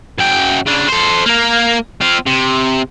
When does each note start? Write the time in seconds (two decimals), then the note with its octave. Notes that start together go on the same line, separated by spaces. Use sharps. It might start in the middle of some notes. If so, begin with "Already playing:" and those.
0.19 F#2 G5
0.67 C#3 D4
0.88 A4 C5
1.25 A#3 A#4
2.01 C4 F4
2.26 C3